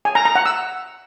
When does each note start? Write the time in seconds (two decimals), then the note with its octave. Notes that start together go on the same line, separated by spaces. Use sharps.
0.05 G#5
0.15 A#5
0.25 A#5
0.35 F#5
0.46 E6